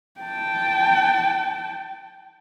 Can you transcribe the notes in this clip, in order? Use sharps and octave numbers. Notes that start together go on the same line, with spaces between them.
G5 A5